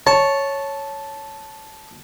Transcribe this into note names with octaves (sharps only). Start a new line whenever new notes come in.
C#5 A5